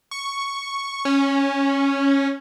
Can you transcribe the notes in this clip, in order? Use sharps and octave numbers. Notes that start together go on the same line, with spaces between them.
C#6
C#4